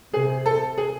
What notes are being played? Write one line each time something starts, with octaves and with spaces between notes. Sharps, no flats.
C3 G#4
A4
G#4